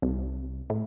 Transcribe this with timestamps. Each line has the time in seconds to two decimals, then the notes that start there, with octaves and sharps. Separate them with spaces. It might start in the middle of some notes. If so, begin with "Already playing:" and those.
0.02 C2
0.70 A2